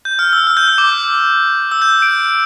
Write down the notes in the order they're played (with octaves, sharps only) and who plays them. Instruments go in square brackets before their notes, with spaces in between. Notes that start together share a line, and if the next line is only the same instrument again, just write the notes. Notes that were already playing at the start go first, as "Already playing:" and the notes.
[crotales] G6
F6
E6
F6
G6
E6
D6
E6
G6
D7